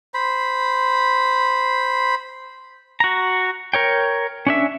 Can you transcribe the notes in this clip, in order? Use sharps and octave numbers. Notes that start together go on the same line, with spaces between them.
C5 B5
F#4 A#5
A#4 C#5 G5
C#4 D4 E5